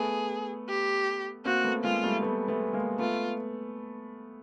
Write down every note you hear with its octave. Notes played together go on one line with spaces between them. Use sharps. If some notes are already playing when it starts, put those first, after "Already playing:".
Already playing: A3 B3 G#4
G4
A#3 C4 F#4
A3 B3
G#3 A#3 F4
G3 A3
A3 B3
A3 B3
G#3 A#3
A3 B3 F4